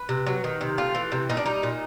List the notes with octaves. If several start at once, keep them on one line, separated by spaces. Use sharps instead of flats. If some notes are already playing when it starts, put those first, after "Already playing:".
Already playing: B4
C3
F#3
D#3
C3
A3 F4
E3
C3
A#2 D#4
D4
G3 D#4
A#2